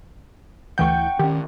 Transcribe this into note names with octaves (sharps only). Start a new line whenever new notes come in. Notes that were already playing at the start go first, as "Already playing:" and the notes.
D2 E3 F#5 G5 C#6 G6
D#3 C#4 G4